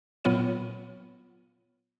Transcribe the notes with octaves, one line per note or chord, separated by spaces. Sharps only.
A#2 F#3 B3 F4 C#5 D#7